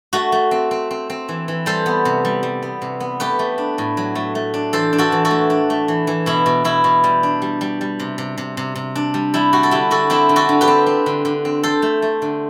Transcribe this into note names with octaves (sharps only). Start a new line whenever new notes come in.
A3 F#4
A3
C4
C4
C4
C4
E3
E3
G3 A4 C5
B3
C3
G3
G3
B3
C3
B3
A3 G4 B4
A3
D4
A2
F#3
A3
A3
D4
E3 A4 C5
D4
F#4 A4
E3
F#4 A4
A3
D4
A3
E3
E3
B2 E4
B2
B2 E4
B2
G3
D4
G3
G3
G3
C3
C3
C3
C3
C3
D4
G3
G3 E4
G3 F#4
A4
D3 E4 G4
D3 F#4 A4
C4 E4 G4
D3
F#4 A4
D3
G4 B4
C4
C4
D3
D3
C4
C4 A4 C5
A3
A3
D3